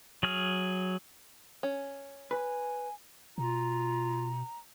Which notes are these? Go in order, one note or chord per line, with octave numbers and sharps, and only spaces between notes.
F#3 G#4 F6
C#4
B4 G#5
B2 F4 A#5